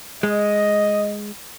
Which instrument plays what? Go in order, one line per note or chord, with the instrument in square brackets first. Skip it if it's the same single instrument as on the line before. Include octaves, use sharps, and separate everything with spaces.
[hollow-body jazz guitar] G#3 [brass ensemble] D#5